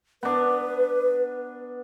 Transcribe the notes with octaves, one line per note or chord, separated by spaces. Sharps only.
B3 D4 B4